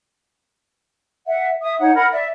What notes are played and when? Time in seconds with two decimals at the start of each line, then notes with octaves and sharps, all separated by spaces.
1.27 E5 F#5
1.62 E5 D#6
1.79 D#4 C#5 F#5
1.95 A#4 F#5 B5
2.12 D5 E5